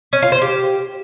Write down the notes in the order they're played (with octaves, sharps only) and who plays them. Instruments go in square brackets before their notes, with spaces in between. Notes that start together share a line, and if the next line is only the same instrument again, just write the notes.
[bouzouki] C#4
F4
C5
G4